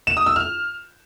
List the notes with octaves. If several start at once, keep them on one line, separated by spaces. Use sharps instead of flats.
E7
D#6
E6
F6